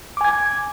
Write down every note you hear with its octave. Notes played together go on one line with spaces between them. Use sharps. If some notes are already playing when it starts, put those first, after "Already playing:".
G#5 D6 G#6